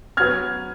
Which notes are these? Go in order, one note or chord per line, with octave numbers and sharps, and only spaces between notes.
F#3 B3 F6 G#6